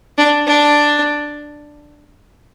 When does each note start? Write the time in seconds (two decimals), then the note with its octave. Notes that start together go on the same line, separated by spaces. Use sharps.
0.18 D4
0.47 D4